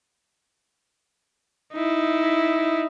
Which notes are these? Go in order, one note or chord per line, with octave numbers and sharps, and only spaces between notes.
D#4 E4